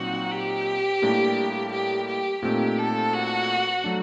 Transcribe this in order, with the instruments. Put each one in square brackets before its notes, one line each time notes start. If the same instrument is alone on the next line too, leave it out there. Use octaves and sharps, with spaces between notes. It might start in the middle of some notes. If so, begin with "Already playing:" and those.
Already playing: [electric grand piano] A#2 F#3 C4 D#4 [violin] F#4
[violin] G4
[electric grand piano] A2 G3 A#3 D4
[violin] G4
G4
[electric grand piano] A#2 A3 C4 D#4 [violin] G4
[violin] A4
F#4
[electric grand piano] F#3 A3 D4